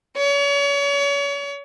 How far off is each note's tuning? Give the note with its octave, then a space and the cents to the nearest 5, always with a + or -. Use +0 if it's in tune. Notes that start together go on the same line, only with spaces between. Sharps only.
C#5 +35